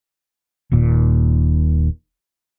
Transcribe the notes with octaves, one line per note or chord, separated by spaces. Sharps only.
D#1 D#2 A#2